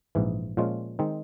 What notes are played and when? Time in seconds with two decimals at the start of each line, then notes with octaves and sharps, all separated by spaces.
0.15 A#1 G#2 E3
0.57 A#2 F3 G#3 C#4 F4
0.99 D#3 G#3 C4 D#4